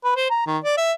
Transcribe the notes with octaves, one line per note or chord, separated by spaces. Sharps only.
B4
C5
A#5
D#3
D5
E5